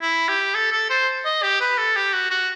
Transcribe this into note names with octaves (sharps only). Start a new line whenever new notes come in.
E4
G4
A4
A4
C5
D#5
G4
B4
A4
G4
F#4
F#4